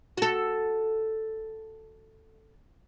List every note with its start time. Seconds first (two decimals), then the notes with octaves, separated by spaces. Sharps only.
0.17 F#4 A4